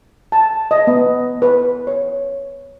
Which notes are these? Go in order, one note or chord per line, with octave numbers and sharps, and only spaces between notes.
A5
D#5
B3
B4
C#5